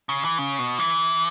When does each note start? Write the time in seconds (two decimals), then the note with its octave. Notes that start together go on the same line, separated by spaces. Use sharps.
0.09 C#3
0.24 E3
0.38 C#3
0.59 B2
0.78 E3